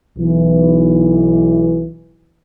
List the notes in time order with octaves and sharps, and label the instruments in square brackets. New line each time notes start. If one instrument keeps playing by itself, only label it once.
[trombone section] B1 E3